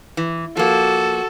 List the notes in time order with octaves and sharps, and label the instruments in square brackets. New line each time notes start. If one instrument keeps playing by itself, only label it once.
[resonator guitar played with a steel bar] E3
[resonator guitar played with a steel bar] F3 A#3 [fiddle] F#4 [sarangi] A4